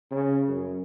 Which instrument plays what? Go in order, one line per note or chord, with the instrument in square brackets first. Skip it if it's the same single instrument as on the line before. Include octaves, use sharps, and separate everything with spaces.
[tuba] C#3
F#2